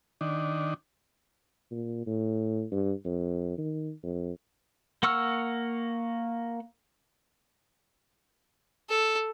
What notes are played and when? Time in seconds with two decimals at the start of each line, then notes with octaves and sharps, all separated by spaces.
0.21 D#3 D4
1.71 A#2
2.07 A2
2.71 G2
3.04 F2
3.58 D#3
4.03 F2
5.03 A#3 F#5 C#6 E6 F6
8.90 A4